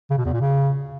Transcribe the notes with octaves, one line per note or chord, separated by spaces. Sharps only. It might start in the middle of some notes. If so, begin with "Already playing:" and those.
C#3
B2
E2
A#2
C#3